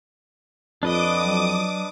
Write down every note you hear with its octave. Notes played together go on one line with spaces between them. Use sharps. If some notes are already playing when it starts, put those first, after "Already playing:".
F2 D4 B4 D#5 D6 D#6
F#3